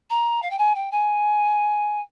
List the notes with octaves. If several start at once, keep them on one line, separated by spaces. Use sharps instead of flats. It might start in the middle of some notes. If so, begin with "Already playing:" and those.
A#5
F5
G5
G#5
G5
G#5